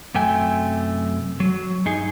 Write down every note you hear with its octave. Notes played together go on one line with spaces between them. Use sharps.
F#2 C3 A3 G5 G#5
F#3
G2 D#4 G#4